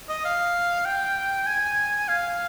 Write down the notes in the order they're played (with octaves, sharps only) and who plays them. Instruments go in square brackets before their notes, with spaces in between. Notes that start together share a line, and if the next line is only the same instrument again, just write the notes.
[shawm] D#5
F5
G5
G#5
F5